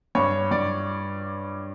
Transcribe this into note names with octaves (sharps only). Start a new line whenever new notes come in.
G2 C#5
G2 D5